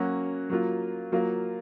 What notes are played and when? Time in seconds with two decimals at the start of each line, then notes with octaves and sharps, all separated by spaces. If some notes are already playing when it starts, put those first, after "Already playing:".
Already playing: F#3 A#3 C#4 F#4
0.50 F#3 A#3 F4
1.12 F#3 A#3 F4